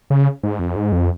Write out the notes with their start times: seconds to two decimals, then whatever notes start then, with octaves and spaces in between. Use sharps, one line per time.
0.10 C#3
0.43 G#2
0.59 F2
0.76 G#2
0.92 F2